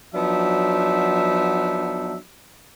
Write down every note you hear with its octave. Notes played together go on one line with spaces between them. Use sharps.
F3 F#3 B3 D4 D#4 E5